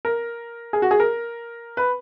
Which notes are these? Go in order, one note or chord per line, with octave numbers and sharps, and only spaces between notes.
A#4
G#4
F#4
G#4
A#4
B4